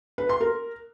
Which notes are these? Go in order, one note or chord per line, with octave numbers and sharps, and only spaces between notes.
B4
C6
A#4